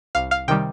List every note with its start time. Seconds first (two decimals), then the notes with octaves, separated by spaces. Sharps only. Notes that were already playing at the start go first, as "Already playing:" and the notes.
0.15 C2 F5
0.31 F5
0.48 C3 D#3 G3 G5